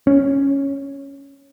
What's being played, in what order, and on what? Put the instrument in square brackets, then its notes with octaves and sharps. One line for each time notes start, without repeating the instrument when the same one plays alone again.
[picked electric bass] C#4